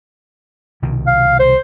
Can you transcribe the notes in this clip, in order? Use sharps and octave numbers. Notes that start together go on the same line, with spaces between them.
C2 B2 D#3
F5
C5